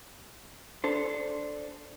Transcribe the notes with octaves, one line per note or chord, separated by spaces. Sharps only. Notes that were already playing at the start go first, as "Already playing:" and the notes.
D4 A4 C5